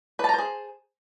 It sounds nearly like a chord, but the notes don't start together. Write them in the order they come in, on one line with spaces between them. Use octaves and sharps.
B4 A5 A#5 C5 G#4